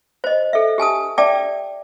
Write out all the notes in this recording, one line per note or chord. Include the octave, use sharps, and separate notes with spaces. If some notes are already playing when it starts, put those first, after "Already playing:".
C5 D#5
A4 E5
G4 G#5 A5 D#6
D5 E5 G5 A5 D6